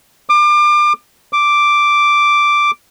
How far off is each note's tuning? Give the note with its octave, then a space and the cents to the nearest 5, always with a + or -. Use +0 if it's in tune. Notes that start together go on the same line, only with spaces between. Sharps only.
D6 +30
D6 +0